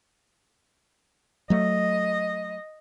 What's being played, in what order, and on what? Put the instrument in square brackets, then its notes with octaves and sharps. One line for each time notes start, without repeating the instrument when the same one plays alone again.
[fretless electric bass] F#3 A3 [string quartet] D#5